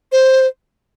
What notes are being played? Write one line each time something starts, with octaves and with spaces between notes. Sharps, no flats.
C5